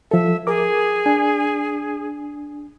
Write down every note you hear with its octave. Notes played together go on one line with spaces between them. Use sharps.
F3 A4 E5
G#4 A#4 D6
D4 G#5